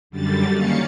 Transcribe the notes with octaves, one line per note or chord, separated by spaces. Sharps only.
F#2 D3 G3 A6
D#3 A#3 C#4 F5 C#7